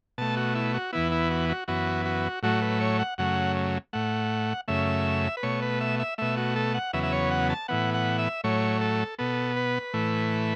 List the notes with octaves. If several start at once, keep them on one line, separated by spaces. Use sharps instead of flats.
B2 A3 A5
F#4
E4
F#4
E2 E3 B3 E4
E4
F#4
F#4
F#2 E3 B3 F#4
F#4
A2 F#3 A3 F#4
B4
C#5
F#5
F#2 C#3 F#3 A3 F#5
A2 A3 F#5
F#2 C#3 A3 E5
B4
B2 A3 C#5
B4
E5
E5
B2 A3 E5
F#4
A4
F#5
E2 C#3 F#3 B3 E5
E5
C#5
F#5
A5
A2 E3 B3 F#5
F#5
E5
A2 F#3 A3 C#5
A4
B2 B3 A4
B4
A2 E3 A3